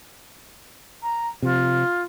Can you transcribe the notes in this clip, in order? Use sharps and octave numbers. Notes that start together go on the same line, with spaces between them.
A#5
C3 F3 F4